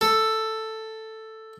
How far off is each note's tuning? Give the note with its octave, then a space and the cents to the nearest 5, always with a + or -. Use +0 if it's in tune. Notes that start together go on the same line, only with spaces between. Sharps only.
A4 +5